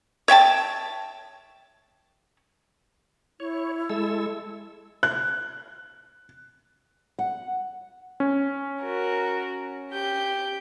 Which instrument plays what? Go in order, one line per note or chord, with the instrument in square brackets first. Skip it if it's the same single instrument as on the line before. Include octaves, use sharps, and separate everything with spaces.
[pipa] C#5 E5 G5 A5
[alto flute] E4 [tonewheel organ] C#5
[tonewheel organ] G#3 A4 E6
[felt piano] F#6
[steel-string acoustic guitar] F#5
[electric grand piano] C#4
[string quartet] F#4 A#4
G4 G6